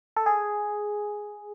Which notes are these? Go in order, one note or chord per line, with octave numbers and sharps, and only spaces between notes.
A4
G#4